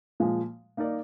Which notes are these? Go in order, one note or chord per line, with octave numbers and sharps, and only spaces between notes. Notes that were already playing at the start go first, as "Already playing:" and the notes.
A#2 F3 G#3
A#3 D#4 A#4 D5